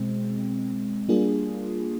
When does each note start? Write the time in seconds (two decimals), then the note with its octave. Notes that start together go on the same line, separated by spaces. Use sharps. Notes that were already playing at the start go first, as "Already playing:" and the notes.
Already playing: B2 G#3 C4
1.08 G3 A#3 D4 F4 G#4